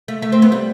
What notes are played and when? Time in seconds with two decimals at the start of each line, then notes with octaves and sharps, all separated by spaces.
0.08 A3
0.22 A3
0.32 C4
0.42 B3
0.52 G3